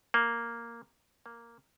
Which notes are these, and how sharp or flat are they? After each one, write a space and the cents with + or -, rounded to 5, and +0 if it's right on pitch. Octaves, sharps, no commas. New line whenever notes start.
A#3 +0
A#3 +0